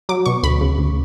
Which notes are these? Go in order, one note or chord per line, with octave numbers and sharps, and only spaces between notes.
F#3 D6
B2 C#6
D2 B5
C#3
D2